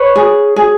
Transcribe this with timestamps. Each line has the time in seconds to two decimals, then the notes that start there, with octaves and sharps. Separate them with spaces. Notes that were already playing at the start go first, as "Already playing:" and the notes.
Already playing: B4 C#5
0.16 G#4
0.56 G#4